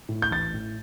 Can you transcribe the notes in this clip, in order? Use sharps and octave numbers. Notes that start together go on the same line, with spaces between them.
A2
G6
A1 A6
A2